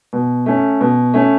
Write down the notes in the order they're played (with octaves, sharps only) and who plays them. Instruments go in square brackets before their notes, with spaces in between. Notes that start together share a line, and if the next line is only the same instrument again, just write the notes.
[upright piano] B2
A3 C#4
B2
A3 C#4